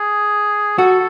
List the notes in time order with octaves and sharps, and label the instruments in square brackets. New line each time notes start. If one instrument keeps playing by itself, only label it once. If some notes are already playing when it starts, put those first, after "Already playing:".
Already playing: [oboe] G#4
[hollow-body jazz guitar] F#4 [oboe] A4